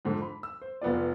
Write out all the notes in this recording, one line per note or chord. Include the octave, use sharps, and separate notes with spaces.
F2 G#2 D3
B5
E6
C5
F1 B3 F4 D5